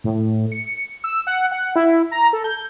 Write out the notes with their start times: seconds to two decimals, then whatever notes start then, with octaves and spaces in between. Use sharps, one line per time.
0.04 A2
0.52 C#7
1.04 E6
1.27 F#5
1.52 F#5
1.76 E4
2.11 A#5
2.33 A4
2.44 G6